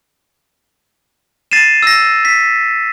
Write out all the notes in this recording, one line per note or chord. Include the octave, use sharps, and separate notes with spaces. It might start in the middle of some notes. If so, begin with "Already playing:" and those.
A6 C7 D#7 E7
E6 A#6
B6